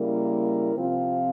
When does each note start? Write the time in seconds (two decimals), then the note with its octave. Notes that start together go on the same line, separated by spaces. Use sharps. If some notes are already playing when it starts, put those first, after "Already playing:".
Already playing: C#3 G3 A#3 E4 A#4
0.73 C3 F3 C4 F4